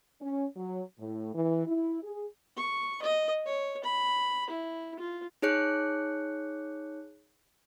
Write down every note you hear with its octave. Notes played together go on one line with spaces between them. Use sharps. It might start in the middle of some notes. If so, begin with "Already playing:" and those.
C#4
F#3
A2
E3
E4
G#4
C#6
D#5
C#5
B5
E4
F4
D#4 G#4 C#5 F#6 C#7